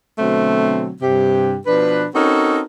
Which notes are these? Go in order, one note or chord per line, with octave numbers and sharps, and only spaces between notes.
B2 D3 F#3 A3 C4
G2 C3 G4
B2 F3 D4 B4
C4 C#4 D#4 F#4 A4 A#4